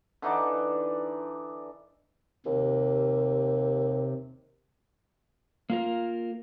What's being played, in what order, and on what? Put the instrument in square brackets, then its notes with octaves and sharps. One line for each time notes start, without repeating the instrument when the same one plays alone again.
[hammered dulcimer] D3 E3 D#4 D5
[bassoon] D#2 [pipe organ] C3
[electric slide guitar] A#3 F4 A#4